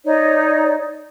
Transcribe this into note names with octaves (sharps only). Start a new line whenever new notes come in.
D#4 C#5 D5